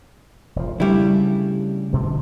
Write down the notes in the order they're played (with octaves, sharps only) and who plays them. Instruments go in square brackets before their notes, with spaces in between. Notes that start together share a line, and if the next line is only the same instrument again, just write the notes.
[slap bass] E1 F3
[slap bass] C#3 A3 D4 [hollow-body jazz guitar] G3 E4
[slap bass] B2 D3 F3